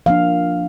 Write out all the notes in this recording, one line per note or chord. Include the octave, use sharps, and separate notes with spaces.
F3 A#3 D4 F5